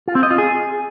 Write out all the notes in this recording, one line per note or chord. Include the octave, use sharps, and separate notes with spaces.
F4
C4
D#5
F4
G#4